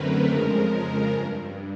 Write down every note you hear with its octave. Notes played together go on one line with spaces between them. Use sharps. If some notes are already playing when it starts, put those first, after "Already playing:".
Already playing: F#2 D3 F#3 A3 C4 A#4 B4
F2 C#3 F3 G#3 A#4
G2